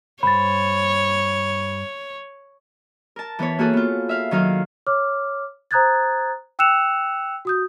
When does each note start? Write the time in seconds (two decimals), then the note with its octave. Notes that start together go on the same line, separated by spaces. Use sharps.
0.23 G2 C5 C#5 B5 A6
3.16 A#4 A5
3.39 E3 B3 B4 C#5
3.59 A#3 F#4 G#4 A4
3.73 B3 F4
4.09 E5 F5
4.31 D#3 F#3 D#4 F5
4.87 C#5 D6 F6
5.71 C5 A#5 D#6 F#6 G#6 A6
6.59 G5 E6 F#6 C#7 E7 F7
7.45 F#4 D#6 G6